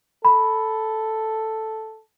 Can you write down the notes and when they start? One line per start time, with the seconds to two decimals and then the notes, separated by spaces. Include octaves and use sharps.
0.25 A4 B5